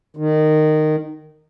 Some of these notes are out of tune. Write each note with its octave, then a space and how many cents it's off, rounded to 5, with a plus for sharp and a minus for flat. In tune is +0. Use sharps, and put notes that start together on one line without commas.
D#3 -15